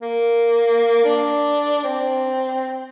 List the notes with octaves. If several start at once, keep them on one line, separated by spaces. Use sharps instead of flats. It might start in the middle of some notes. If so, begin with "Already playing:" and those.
A#3
D4
C4